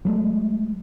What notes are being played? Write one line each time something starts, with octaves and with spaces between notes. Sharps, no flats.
F#3 G#3 A3